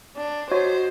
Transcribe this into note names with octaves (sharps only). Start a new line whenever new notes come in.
D4
F#4 C5 C#5 D#5